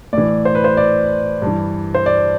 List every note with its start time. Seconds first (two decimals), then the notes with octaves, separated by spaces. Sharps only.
0.13 A2 E3 D5
0.45 C5
0.55 B4
0.64 C5
0.77 D5
1.42 G2 E3
1.94 C5
2.06 D5